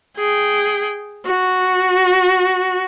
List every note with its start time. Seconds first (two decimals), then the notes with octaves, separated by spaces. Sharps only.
0.17 G#4 G5
1.26 F#4